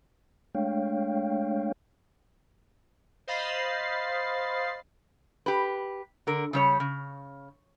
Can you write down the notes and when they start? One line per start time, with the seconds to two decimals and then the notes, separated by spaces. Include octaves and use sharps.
0.55 G#3 A3 D4 C#5 F5 G5
3.27 C5 D#5 F5 B5 A6 C7
5.46 G4 B4
6.27 D3 A#4
6.53 C#3 G3 C#5
6.80 C#3